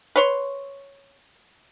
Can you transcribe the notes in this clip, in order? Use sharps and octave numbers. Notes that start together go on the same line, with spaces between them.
B4 C#5 C6